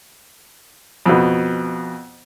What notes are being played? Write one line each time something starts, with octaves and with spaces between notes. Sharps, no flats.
F2 B2